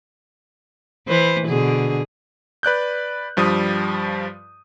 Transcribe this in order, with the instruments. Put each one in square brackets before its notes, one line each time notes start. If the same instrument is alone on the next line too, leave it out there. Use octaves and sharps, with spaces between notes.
[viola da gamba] E3 B4 C5
B2 D3 G#4
[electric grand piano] B4 D5 F#6 G6
G2 F3 G3 D#6